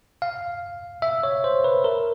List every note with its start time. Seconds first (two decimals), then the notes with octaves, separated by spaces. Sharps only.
0.22 F5
1.02 E5
1.23 C#5
1.44 C5
1.64 B4
1.84 A#4